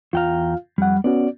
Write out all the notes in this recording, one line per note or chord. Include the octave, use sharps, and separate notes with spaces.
E2 F4 F5 G5 A#5
F2 G3 F#5
B3 C#4 F#4 D5